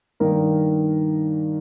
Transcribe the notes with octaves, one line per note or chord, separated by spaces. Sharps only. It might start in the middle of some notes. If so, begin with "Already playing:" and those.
G2 D#3 A#3 D#4 A#4